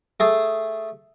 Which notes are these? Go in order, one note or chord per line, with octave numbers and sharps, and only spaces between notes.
A3 G#4 A4